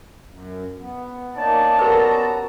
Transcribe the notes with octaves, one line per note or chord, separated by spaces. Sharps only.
F#2
B3
A#3 C#4 D#4 D5 A5
B3 F#4 G4 A#4 B4 A#5